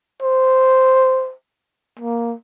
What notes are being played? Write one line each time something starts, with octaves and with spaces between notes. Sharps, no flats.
C5
A#3